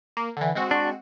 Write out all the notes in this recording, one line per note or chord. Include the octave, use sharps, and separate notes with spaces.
A#3
D3 E3
G#3 C4 F#4
D4